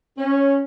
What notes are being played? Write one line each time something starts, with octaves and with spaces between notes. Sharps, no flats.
C#4